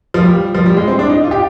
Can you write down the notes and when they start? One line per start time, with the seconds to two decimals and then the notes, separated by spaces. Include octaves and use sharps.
0.14 F3
0.22 G3
0.55 F3
0.66 G3
0.77 G#3
0.88 C4
0.99 D4
1.10 D#4
1.24 F4
1.31 G4